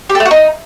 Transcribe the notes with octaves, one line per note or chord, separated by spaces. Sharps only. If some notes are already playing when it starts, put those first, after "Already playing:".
G4
A4
A3
F#4
D#4